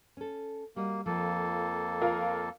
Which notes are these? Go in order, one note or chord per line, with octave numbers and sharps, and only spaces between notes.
C#4 A4
G3 A#3 F#4 D#5
F2 F3 A#3 A4
F4 A#4 F5